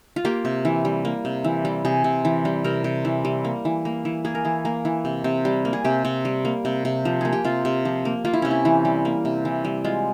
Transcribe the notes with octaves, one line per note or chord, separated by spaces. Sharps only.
F4
A#3 G4
C3
E3
G3
A#3
C3
E3
G3
C3 G#4
C3
E3
G3
C3 A#4
C3
E3
G3
A#3
E3
A#3
E3
A#3 G#4
A#4
E3 G#4
A#3
E3
C3
C3
G3
A#3
G#4
C3 G4
C3
G3
A#3
C3
C3
F3
A#3 G#4
G4
C3 F4
C3
F3
A#3
A#3 F4
E4
C3 C#4
E4
E3
G3
A#3
C3
E3
G3
G#3 F4